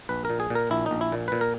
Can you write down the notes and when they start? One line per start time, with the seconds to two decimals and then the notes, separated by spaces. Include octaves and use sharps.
0.09 A#1 B4
0.25 A#2 A#4
0.40 G#4
0.50 A#2 A#4
0.71 A#1 E4
0.86 D#4
0.91 A#1
1.01 E4
1.12 A#2
1.28 A#2 B4
1.41 A#4